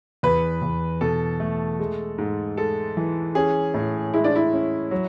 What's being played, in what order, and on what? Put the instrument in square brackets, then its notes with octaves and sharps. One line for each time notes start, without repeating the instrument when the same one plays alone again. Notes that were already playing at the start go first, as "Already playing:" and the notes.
[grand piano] E2 [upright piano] B4
[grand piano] E2
[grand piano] B2 [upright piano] A4
[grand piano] A3
G#3
G#2
[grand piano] G#3 [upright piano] A4
[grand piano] E3
[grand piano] C#4 [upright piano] G#4
[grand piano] A2
[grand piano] G#3 [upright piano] E4
[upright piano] D4
E4
[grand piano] C#4
F#3